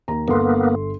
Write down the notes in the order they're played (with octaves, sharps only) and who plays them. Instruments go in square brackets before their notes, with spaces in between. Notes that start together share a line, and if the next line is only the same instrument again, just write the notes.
[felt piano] D#2 A#5
[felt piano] G1 A4 C6 [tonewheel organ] A#3 B3